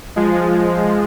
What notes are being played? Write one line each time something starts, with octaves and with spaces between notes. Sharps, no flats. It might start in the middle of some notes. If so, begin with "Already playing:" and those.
F3 G#3